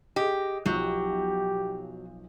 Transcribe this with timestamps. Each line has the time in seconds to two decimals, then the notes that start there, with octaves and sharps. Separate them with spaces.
0.16 G4 G#4 D#5
0.66 B1 F3 F#3 G4 G6